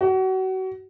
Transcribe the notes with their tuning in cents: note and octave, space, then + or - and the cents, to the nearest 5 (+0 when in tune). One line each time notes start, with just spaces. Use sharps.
F#4 +30